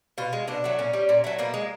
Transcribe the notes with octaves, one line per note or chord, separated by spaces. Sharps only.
B2 F4
G#3
B2 D4
F#3 A3
A#2 C#4
G3
A#2
F#3 A3
B2 A#3
G#3